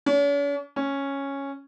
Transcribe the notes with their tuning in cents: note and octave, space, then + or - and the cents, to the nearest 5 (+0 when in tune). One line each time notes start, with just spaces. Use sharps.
C#4 +45
C#4 -5